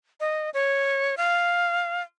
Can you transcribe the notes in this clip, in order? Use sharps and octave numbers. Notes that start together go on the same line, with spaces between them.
D#5
C#5
F5